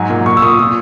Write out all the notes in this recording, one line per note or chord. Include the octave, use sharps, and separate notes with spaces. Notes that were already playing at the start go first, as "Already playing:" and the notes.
Already playing: G#2 F#3 G#5
A#2
A#2 C#6
E6
A#2 D#6
A#2 D#6